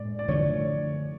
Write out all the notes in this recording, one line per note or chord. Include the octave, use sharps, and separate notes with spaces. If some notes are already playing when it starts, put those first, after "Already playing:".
Already playing: A2 G#3 D5
D5
D3 F3 A3 C#5